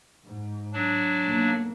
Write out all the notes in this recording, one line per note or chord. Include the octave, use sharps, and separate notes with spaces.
G#2
F#3 D4
B1 A#3